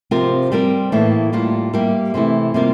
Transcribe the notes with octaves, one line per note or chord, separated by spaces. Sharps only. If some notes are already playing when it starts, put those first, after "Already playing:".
C3 F3 C4 F4 A#4
G3 C4 G4 A#4
A2 E3 A#3 E4 A4
A2 G3 A#3 F4
G3 A#3 E4 G4 A#4
C3 E3 A3 E4
C3 G3 A#3 F4 A#4